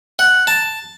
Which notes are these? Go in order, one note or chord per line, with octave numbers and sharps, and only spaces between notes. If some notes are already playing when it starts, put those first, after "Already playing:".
F#5
A5